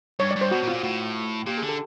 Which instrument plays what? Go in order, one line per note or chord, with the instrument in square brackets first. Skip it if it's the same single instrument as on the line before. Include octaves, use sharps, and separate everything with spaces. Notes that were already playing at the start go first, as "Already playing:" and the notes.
[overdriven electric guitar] G2 [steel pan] C#5
[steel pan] D5
[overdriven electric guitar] G2
[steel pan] C5
[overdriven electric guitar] B2 [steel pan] F#4
[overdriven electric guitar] A#2
[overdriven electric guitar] B2 [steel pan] F4
[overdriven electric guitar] A#2
[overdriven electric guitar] A2 [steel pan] F#4
[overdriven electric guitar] A#2 [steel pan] G4
[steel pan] G#4
[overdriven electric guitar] D3
[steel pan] A4